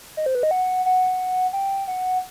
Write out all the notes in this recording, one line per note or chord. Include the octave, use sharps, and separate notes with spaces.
D#5
C5
B4
D#5
F#5
F#5
G5
F#5